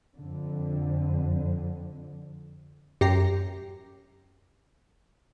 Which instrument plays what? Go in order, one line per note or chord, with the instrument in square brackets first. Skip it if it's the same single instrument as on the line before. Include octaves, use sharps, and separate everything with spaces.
[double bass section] F2 D3
[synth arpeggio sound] F#2 C7 [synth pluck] G4 A#5